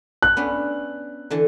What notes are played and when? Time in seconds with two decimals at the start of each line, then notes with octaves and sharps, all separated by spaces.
0.23 F#6
0.37 B3 C#4 D4
1.30 D3 E3 A5